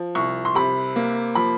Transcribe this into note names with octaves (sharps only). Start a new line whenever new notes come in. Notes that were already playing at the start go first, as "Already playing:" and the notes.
Already playing: F3
C2 C#6
C6
C3 B5
A#3
F3 B5